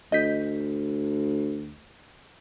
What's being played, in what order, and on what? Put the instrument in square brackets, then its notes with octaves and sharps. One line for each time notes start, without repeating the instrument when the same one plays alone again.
[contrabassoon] D2 [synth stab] D#5 G6 B6